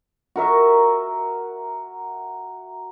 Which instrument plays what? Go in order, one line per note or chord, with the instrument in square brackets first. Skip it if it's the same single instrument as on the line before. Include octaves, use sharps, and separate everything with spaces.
[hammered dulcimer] F#4 A#4 E5